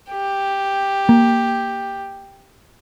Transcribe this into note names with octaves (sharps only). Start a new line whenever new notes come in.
G4
A#3